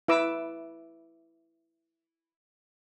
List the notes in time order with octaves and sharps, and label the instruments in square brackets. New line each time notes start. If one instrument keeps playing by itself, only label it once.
[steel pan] E4 B4 D6 E6